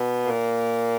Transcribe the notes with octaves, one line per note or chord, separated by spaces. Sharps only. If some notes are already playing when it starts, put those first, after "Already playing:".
Already playing: B2 B3
A#2 A#3